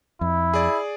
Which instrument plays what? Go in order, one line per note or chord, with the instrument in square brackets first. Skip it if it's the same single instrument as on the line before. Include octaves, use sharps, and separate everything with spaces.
[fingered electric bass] F2 [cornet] E4
[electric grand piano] G#4 D5